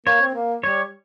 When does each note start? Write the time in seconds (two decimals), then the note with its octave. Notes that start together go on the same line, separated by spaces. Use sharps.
0.06 A#3 C#5
0.21 C4
0.34 A#3
0.63 G3 C#5